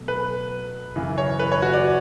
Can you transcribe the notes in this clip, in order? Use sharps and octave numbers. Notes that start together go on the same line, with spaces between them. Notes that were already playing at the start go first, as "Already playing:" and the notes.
Already playing: B2 F#3 A3
B4
F#2 C#3 E3
C#5
B4
C#5
F#4
D5